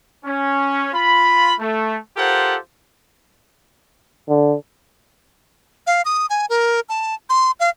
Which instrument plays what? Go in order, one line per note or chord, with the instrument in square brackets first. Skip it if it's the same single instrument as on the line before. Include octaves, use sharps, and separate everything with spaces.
[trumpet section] C#4
F4 B5
A3
F4 G4 A4 A#4 C5 F#5
[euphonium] D3
[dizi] F5
D#6
G#5
A#4
A5
C6
F5